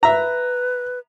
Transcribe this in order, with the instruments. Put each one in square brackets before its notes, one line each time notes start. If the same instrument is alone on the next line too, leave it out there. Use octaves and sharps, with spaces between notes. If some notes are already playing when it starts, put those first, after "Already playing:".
[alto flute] B4 [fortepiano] E5 A#5